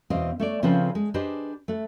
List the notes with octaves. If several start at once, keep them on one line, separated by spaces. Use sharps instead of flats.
E2 B2 C4 D#5 F5
A3 C#5 D5
C#3 F3 C4 C#4 A4 B4
G#3
D4 G4 G#4 B4 C5 D#5
A3 B4